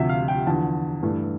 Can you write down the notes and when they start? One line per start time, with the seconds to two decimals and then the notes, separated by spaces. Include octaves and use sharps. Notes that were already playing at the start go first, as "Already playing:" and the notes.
Already playing: D2 C3 F3 E5
0.09 F5
0.28 G5
0.47 E2 D3 F3 A5
1.03 G2 E3 A3